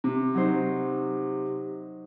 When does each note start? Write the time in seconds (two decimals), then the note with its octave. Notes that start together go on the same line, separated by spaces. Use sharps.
0.04 C3
0.34 F#3 D#4 C5